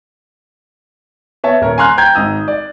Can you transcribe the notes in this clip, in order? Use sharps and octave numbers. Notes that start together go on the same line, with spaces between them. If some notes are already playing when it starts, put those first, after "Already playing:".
B3 C#5 E5 A5
D#1 A#4 C#5
G#5 A#5 C6 F6 F#6
G5 A#5 G6 G#6
G#1 A#5 D#6 E6
D5